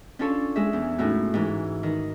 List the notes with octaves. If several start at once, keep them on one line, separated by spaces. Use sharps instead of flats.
C#4 D4 F4 A4 C#5
G#3 G#4 E5
E2
A2 C#4 D#4 E4 F#4
G#2 E3
D#3